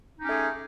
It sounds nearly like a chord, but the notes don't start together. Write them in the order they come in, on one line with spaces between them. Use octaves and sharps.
D#4 G4 C#4 A3 G#4